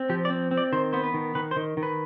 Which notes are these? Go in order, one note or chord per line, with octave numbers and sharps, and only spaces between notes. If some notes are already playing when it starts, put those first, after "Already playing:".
Already playing: C4
F3 G4
D5
C4
C4
D5
D#3 C5
B3 C5
B4
D#3
D#3 B4
C5
D#3
D#3
B4